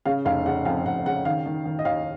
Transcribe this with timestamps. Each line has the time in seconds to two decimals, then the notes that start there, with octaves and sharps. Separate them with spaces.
0.05 C#3 F5
0.25 F1 F5
0.46 C#3 F#5
0.65 F2 F5
0.85 F2 F#5
1.06 C#3 F#5
1.25 D#3 F5
1.46 D#3
1.65 D#3
1.79 D#5
1.85 D#2 F5